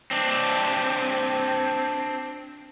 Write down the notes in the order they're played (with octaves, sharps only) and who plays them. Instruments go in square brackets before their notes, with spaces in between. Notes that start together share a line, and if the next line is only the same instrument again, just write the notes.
[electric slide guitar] C4 D4